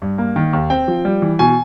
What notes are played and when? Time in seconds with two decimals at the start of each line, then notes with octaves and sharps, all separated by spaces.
0.02 G2
0.18 A#3
0.36 D#3
0.53 D#2
0.70 C4 G5
0.88 F3
1.05 G3
1.22 E3
1.39 B2 G#5